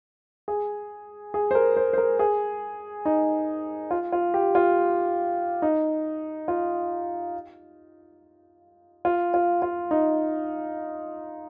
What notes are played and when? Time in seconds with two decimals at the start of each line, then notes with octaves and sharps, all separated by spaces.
0.48 G#4
1.34 G#4
1.51 C5
1.55 A#4
1.77 C5
1.93 C5
1.98 A#4
2.19 G#4
3.05 D#4
3.91 F4
4.12 F4
4.34 G4
4.55 F4
5.62 D#4
6.48 F4
9.05 F4
9.34 F4
9.62 F4
9.91 D#4